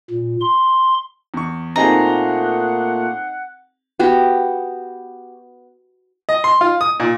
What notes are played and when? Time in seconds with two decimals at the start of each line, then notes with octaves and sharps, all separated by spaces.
0.10 A#2
0.41 C6
1.34 E2 C#6
1.76 A#2 A3 A#3 C4 D#4 G#4 F#5 A#5
3.99 B3 F#4 G4
6.29 D#5
6.44 C6
6.61 F4
6.81 D#6
7.00 A#2